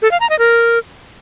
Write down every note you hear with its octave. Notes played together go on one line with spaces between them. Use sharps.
A4
F5
A#5
D#5
A#4